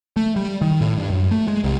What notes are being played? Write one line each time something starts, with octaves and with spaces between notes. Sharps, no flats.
A3
G3
D#3
A2
G2
F#2
A3
G#3
C2